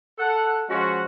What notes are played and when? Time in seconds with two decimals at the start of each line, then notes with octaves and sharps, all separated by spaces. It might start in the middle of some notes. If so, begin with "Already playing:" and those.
0.19 A4 F#5
0.70 F3 G#3 C#4 F#4